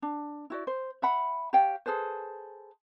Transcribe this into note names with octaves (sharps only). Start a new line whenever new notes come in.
D4
E4 F#4 D5
C5
E5 F#5 B5
G4 C#5 F5 G5
G#4 A4 B4 C5